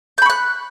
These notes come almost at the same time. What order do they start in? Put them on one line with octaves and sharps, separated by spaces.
G6 B5 C#6 F#6